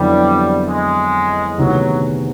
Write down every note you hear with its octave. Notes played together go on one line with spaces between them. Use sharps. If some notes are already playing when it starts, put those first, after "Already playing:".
Already playing: F2 D3 F#3 G3 B3 E4
G#3
D2 C3 D#3 F#3 G#3 B3